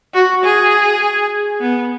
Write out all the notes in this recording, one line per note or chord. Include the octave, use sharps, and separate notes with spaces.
F#4
G#4
B3